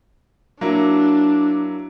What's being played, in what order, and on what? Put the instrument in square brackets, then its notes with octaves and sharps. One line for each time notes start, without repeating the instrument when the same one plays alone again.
[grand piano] F#3 A#3 E4 [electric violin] D4